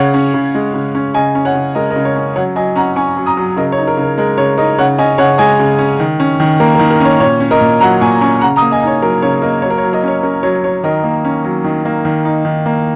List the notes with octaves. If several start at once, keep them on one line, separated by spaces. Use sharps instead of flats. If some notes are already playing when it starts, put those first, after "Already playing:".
Already playing: C#3 C#5 F#5
C#4
C#3
G#3
C#3
C#4
C#3 D#5 G#5
C#4
C#5 F#5
C#3
G#3 A#4 D#5
A#4 D#5
C#3
C#5
C#4
F#3 C#5 F#5
F#3 D#5 G#5
C#4 F#5 A#5
C#4 G#5 C#6
F#3
A#5 D#6
F#3
C#3 A#4 D#5
C#5
D#4
A#4
C#3
A#4
G#3 A#4
C#3 C#5
D#4 A#4 D#5
C#3 C#5 F#5
C#4 D#5 G#5
C#3 C#5 F#5
G#3 D#5 G#5
C#3
C#4
D#3
C#4
D#3
A#3 A#4
A#4
D#3
A#4
C#4 C#5
A#2 C#5
C#4
A#4 D#5
A#2
F#3 F#5 A#5
A#2 G#5 C#6
C#4 G#5 C#6
C#3 F#5 A#5
A#5 D#6
A#3
D#5 G#5
D#4
C#5
F#3 A#4
C#3 C#5
A#3 A#4 D#5
F#3 C#5
A#4
C#5
F#3
A#4 D#5
C#4 C#5
C#4 A#4
F#3 C#5
F#3 C#5
D#3 A#4 D#5
A#3
C#4
F#3
D#3
A#3
D#3
D#4
D#3
A#3